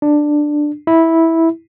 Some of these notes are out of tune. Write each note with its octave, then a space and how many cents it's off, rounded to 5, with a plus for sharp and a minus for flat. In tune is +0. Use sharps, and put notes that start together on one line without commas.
D4 +10
E4 -10